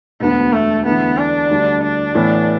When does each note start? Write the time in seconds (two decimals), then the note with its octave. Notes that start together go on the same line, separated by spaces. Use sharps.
0.20 E1 D2 D3 B3
0.53 A3
0.85 E2 D3 A3 B3
1.18 D4
1.50 D2 D3 G3
1.83 D4
2.15 A2 E3 B3